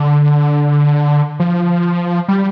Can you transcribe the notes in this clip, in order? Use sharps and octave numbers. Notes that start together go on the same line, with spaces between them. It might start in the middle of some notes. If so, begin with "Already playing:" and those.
Already playing: D3
F3
G3